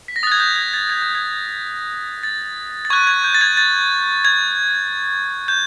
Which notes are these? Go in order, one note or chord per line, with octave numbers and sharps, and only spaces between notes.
B6
A#6
D#6 F#6 G#6 A6
G6
G#6
A6
G#6
G6
G#6
A6
A6
C#6 F#6 G#6
G#6
G6
A6
G#6
A6
G#6
G6